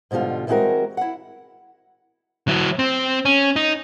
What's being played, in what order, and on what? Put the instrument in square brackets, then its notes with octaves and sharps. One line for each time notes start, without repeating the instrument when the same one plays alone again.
[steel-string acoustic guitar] G#2 B2 D3 G3 F4
E3 G3 G#3 C4 F#4 A#4
E4 F#5
[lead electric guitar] F#3 E4
C4
C#4
D#4